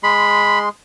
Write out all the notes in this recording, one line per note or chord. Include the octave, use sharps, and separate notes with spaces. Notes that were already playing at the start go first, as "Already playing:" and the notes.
G#3 B5 C6